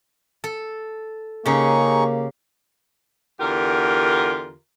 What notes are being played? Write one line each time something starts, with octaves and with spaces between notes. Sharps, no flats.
A4
C#3 A#3 D#4 G4 G#4 C#6
E2 D3 F4 G4 A#4